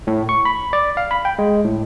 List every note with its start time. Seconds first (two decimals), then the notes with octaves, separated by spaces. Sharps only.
0.07 A2
0.29 C#6
0.45 B5
0.73 D5
0.97 F5
1.11 B5
1.25 G5
1.39 G#3
1.65 A2